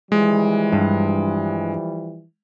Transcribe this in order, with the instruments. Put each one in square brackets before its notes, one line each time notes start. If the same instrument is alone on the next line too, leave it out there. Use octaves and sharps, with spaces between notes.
[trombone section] E3 F3 G3 [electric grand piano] G#3
[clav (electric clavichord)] G2